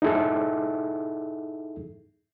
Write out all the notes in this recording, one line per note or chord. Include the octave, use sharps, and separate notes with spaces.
D#4 E4 G#4 A4 E5